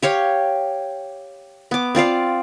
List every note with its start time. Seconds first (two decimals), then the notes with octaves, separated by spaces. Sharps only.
0.02 G4 C#5 F5 G5
1.71 B3 D6
1.95 C4 F4 D5 F5